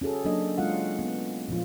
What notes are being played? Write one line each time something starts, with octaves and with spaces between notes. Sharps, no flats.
C#4 F#4 G#4 A4
F#3 A#3 D4 A4 D#5
G#3 C#4 F4 F5 F#5
B3
A#2 F3 F4